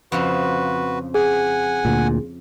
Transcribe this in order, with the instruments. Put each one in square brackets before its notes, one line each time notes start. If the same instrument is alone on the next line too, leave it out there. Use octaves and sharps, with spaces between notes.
[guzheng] F2 C#3 F3 [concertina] F#4 B4
[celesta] G#4 [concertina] F#5 G#5
[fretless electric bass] D2 A#2